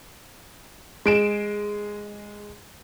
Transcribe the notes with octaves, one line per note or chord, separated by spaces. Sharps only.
G#3 D7 E7